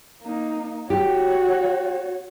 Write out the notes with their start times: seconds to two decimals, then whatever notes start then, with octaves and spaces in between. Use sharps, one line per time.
0.23 A#3 D#4
0.90 F#4 G4 C#5